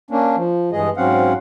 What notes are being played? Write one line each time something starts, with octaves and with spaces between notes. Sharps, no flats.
A#3 C#4 D4
F3
G2 E3 G#3 G#4 D#5
G#2 F#3 C4 C#4 F5 F#5